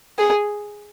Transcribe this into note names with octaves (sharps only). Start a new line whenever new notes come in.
G#4